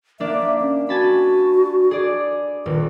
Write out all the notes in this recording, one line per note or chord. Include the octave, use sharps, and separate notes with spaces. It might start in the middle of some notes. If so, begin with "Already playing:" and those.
A#3 D4 E5
C#4
F#4 G#5 A5 B5
G#4 D5
D#1 B4